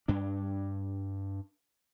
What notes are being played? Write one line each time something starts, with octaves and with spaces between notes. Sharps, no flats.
G2 D4